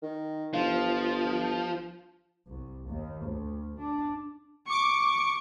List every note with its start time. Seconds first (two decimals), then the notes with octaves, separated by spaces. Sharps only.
0.02 D#3
0.53 G1 F3
2.47 C2
2.88 D#2
3.24 D2
3.79 D4
4.67 C#6 D6 C#7